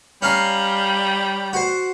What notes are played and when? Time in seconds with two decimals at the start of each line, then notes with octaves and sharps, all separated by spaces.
0.22 G3 C#4 F5 A#5
1.53 F#4 C5